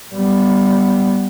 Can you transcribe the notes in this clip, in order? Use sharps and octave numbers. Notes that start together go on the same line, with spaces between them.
G3 B3